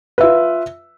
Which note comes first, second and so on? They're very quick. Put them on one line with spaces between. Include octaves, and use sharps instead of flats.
B4 E5 F4